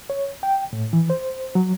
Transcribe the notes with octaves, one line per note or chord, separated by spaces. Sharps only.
C#5
G5
A2
E3
C5
F#3